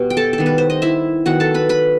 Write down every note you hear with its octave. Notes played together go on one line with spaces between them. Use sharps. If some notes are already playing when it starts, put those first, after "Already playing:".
Already playing: B2 G3 B3 G4
G5
A4 A5
A4
D#3 G3 B3
B4
C5
D#5
E4 E5
D#3 F#3 B3 F#4 F#5
A4 A5
B4 B5
B4 B5